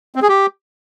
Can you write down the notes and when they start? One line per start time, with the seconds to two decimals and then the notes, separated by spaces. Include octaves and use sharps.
0.16 C4
0.22 G#4
0.29 G4